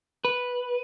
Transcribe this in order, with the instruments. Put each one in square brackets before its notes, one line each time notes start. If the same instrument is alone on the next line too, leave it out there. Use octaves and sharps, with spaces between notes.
[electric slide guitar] B4